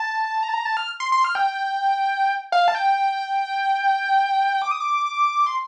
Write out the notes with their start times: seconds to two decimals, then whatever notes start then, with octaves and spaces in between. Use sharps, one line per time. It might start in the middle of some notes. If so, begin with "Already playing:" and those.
Already playing: A5
0.43 A#5
0.49 A5
0.54 A#5
0.65 A5
0.77 F6
1.00 C6
1.12 C6
1.24 F6
1.35 G5
2.52 F5
2.68 A5
2.75 G5
4.62 D6
4.71 D#6
4.80 D6
5.46 C6